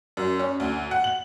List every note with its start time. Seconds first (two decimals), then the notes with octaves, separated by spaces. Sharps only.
0.17 F#2
0.39 C#4
0.60 D2
0.91 F#5
1.04 F#7